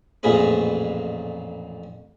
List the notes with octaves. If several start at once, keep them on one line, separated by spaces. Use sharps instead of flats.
A1 F2 A#2 G#4 B4